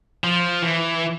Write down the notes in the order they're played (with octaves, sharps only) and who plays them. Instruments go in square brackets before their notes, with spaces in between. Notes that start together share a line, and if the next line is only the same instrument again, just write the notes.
[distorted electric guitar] F3
E3